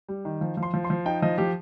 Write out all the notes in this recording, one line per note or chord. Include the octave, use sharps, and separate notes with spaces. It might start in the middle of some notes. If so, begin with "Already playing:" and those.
G3
D#3
F3
F3
C6
F3
C6
F3
D#4 G5
F3 D#5
F3 G4